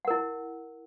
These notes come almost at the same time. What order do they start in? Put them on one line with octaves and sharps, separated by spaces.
F#5 A#4 E4